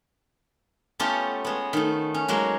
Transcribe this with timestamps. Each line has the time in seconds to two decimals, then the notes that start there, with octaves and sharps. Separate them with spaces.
0.99 A3 B3 C#4 F4 G4 A4
1.45 G#3 B3
1.73 D#3 A3
2.14 C#4
2.28 F#3 G#3 A#3